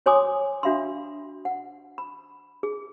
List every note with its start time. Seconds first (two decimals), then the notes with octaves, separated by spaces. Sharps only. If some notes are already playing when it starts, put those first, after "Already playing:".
0.06 F#4 C#5 G#5 C6 D6 D#6
0.63 D4 F#4 E5 F5 B5 C6
1.45 F#5
1.98 B5
2.63 G#4